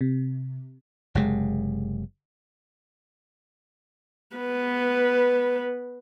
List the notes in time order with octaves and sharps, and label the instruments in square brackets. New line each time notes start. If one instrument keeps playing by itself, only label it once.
[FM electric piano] C3
[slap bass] F#1 C3 G#3
[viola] B3 B4